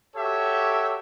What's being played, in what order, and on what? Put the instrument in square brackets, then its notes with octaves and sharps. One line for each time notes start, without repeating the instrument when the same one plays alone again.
[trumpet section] F#4 G4 A4 C#5 E5